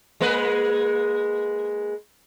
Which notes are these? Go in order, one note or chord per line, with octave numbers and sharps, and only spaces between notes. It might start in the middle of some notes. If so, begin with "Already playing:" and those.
G#3 A#3 B4